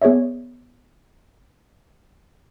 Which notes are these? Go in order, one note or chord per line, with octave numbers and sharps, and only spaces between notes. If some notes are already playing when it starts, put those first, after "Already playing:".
B3 G#4 C#5 D5 E5